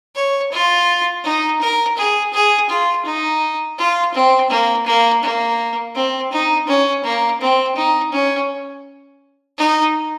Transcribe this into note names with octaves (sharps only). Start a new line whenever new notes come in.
C#5
F4
D#4
A#4
G#4
G#4
F4
D#4
F4
C4
A#3
A#3
A#3
C4
D#4
C#4
A#3
C4
D#4
C#4
D#4